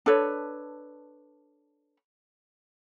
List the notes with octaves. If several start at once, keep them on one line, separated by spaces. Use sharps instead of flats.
D4 A4 B4 C#5